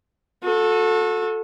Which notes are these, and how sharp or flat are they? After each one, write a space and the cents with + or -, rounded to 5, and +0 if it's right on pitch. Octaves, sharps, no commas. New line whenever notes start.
F#4 -35 A4 +0